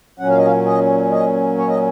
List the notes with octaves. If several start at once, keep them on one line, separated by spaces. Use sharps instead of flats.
A#2 F#3 C#4 F#5
F5
D#5
F5
D#5
D#5
C#5
D#5